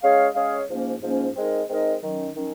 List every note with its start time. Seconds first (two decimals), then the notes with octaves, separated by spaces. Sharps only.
0.01 G#3 C#4 G#4 C#5 F5
0.34 G#3 C#4 G#4 C#5 F5
0.67 G#2 F3 A#3 C#4
1.01 G#2 F3 A#3 C#4
1.35 G#3 C4 D#4 A#4 D#5
1.68 G#3 C4 D#4 A#4 D#5
2.01 D#3 F#3 C#4
2.35 D#3 F#3 C#4